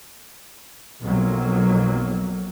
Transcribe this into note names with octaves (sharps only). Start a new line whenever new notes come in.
B1 F2 B2 F#3 A#3